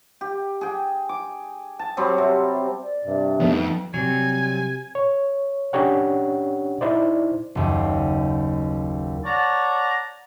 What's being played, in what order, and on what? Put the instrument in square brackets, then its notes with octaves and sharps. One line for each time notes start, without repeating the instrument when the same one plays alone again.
[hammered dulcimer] G4
G#4 G5
D6
A5
F#3 G3 C4 F#4
C3
[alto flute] D5
[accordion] G2 C3
[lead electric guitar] F2 [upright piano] A3 B3 [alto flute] D#4
[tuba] C3 [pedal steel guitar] F#3 G3 C4 [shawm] G#5
[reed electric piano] C#5
C#4 D4 G4 C#5 F#5
D#4 E4 C5 D5
[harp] F#1 D#2
[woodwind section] C#5 D5 F#5 A5 A#5